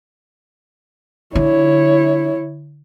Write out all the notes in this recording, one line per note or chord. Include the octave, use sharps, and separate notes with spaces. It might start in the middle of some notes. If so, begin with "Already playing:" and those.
D3 E4 C#5